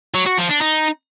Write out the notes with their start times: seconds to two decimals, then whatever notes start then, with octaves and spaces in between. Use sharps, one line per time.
0.14 F#3
0.26 F#4
0.38 F3
0.49 D4
0.61 D#4